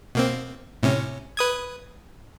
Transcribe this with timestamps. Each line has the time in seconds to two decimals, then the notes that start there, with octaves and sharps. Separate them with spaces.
0.15 B2 A#3 C4
0.83 A2 C3 C#4
1.37 B4 D#6 G#6